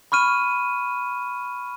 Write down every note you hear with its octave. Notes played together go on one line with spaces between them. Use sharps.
B5 C#6 F6 D#7